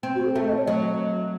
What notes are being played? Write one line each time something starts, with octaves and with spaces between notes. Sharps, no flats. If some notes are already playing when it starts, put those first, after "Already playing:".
C4
F#4
A4
A3
D#5
C#5
F#3 D#5